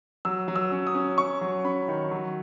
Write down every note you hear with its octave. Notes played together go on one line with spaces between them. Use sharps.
F#3 E6
F#3
E6
C#4
D#6
C#4
C#4 C#6
F#3
C#4 B5
D#3
F#3